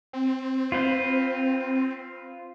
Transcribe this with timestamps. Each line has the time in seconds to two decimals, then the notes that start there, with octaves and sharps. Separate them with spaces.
0.13 C4
0.72 F4 B4 C5